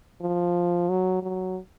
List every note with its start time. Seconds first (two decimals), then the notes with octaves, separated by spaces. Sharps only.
0.21 F3
0.89 F#3
1.22 F#3